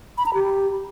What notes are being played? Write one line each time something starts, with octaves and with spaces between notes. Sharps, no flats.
B5
A#5
G4